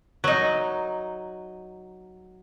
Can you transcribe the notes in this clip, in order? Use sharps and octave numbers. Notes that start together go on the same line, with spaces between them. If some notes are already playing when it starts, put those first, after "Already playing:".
F#3 D#4